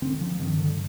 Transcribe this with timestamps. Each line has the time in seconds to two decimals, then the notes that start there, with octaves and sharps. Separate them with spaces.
0.02 D3 C4
0.21 F3
0.40 G2 D#3
0.58 D3